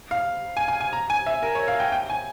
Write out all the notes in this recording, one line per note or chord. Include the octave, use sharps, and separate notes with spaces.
F5
G#5
G#5
G#5
A#5
G#5
E5
A#4
C#5
F5
G5
G5
G#5